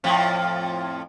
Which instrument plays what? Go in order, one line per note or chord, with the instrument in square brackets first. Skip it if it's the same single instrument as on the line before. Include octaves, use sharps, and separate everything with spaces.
[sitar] F2 A2 F3